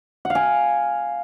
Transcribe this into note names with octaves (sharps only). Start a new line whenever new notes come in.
F#5
F5
G#5